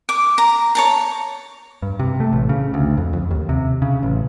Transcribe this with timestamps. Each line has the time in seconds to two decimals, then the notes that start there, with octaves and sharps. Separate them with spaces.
0.09 D6
0.38 A#5
0.75 C#5 A5 A#5
1.82 G2
1.99 C3
2.20 A3
2.33 A1
2.49 C#3
2.74 D2
2.98 F2
3.13 F2
3.31 D#2
3.49 C3
3.82 C#3
4.03 A1